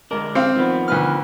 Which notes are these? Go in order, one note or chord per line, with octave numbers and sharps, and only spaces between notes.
D3 G#3 D4 A#4
C4 F5
D#3 F3 B3
D2 B4 F6